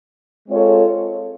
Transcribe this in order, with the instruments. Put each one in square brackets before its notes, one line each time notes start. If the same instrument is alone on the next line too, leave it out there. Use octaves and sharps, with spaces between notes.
[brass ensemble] G#3 C4 F4 A4 C#5